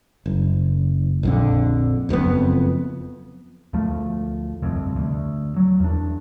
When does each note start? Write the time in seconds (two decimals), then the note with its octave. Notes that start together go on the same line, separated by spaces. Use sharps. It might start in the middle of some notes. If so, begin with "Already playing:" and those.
0.26 F#1
1.23 A#1 F2 D3
2.09 F#1 F2 C#3 B3
3.73 D2 F3 A3
4.62 G1 C2 F2
4.96 D2
5.56 F#3
5.80 E2 D4